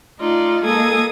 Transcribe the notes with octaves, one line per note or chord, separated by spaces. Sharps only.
A3 D#4 F4 D5
G#3 A#3 A4 D#6 G#6